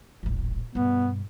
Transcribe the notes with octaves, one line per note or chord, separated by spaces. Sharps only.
D#1 A1
G2 B2 B3